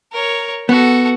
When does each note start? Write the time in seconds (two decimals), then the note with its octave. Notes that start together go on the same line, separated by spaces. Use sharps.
0.12 A#4 C#5
0.69 B3 F#4 A4